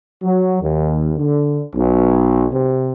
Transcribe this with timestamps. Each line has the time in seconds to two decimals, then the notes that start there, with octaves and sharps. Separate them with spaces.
0.23 F#3
0.61 D#2
1.17 D3
1.75 B1
2.51 C3